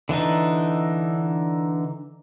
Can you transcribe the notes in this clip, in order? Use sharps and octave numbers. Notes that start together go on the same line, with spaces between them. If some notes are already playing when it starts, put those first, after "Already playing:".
D3 E3 D4 D#4